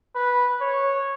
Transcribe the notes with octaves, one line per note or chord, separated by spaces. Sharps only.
B4
C#5